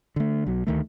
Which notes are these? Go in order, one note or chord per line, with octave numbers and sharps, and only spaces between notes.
D3 A3
B1 F#3
D2 D#3 A3